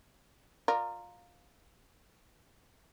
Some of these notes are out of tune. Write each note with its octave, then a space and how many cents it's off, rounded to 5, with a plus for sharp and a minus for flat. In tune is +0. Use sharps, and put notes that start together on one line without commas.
F4 +15 A#4 -10 D5 +20